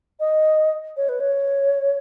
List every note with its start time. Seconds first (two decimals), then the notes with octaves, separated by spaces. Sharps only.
0.20 D#5
0.97 C#5
1.09 B4
1.20 C#5